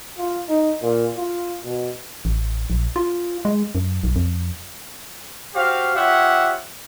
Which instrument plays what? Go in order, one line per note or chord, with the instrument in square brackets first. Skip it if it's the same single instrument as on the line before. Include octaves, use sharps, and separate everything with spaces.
[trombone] F4
D#4
A#2
F4
B2
[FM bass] A1
A#1
F4
G#3
F#2
B1
F2
[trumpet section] F#4 G4 C5 F5
F4 G4 C#5 E5 F#5